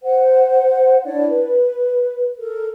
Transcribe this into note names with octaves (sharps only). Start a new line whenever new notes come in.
C5 F#5
D4 E4 C#5 D5
B4
A4 A#4